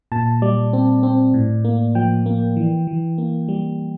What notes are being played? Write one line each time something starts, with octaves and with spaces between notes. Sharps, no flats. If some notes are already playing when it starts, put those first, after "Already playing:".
A#2 A5
G3 D5
C4
C4
A2
A#3
F3 G5
A#3
E3
E3
A#3
G3